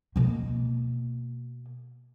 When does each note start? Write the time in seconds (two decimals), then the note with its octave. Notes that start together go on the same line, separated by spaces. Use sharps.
0.16 B2 A#3